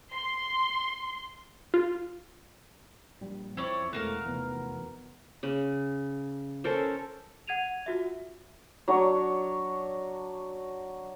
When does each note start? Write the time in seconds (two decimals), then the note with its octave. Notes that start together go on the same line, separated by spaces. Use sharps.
0.14 C6
1.74 F4
3.21 A#1 G3
3.57 F2 C4 E4 C#5 D5
3.93 E1 E2 A3 F#4 A#4 F5
4.25 F1 E2 B3
5.43 C#3
6.64 C#4 A4 A#4 C5
7.47 F#5 G#6 D#7 F7
7.86 F4 F#4 E5
8.88 F#3 D4 C#5